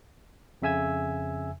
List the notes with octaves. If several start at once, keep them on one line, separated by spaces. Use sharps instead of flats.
F2 C#3 E5 G#5 E6 G#6